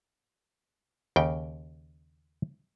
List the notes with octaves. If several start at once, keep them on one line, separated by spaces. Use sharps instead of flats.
D#2 C#3 G5